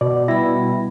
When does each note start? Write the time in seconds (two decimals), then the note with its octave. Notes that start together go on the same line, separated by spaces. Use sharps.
0.01 B2 D5
0.28 G3 E4 B5